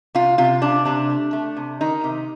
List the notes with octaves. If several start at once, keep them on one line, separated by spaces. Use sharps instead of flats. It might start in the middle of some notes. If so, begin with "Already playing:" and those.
C3 F4
C3 F4
C3 D4
C3 D4
A3
A3
C3
D#3 D#4
C3